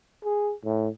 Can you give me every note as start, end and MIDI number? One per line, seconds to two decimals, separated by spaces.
0.24 0.53 68
0.64 0.88 45